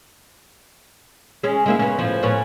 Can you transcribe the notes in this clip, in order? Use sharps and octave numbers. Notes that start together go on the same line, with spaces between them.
G#3 C#4
G#3 A#3 E4
B3 C#4
A2 F3
A2 B3 C#4